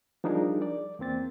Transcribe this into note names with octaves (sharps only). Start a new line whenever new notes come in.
F3 G3 D4 D#4 G#4 A#4
D5
E2 A#3 C4 A6